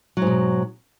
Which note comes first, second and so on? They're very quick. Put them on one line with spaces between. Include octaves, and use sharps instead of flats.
F#3 G#2 B2